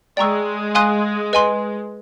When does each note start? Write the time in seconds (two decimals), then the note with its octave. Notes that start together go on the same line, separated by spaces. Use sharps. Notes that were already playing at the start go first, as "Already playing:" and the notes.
0.17 G#3 D5 G5 A#5 C#6 E6
0.75 F5 G#5 C6 D#6 F#6
1.33 B4 D#5 G#5 C6